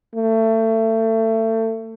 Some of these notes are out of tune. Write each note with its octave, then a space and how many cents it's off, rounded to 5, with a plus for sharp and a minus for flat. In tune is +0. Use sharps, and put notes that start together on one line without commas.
A3 +25